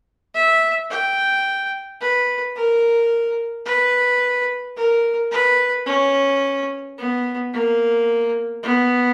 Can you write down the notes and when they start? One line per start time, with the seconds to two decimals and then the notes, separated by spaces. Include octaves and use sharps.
0.35 E5
0.90 G5
2.01 B4
2.56 A#4
3.66 B4
4.76 A#4
5.32 B4
5.86 C#4
6.98 B3
7.53 A#3
8.63 B3